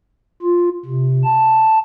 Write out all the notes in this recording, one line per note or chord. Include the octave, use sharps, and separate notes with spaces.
F4
C3
A5